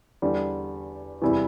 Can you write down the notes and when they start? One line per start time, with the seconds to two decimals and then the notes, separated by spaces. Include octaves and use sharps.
0.22 E2 D3 G3
1.22 E2 C3 G3 E4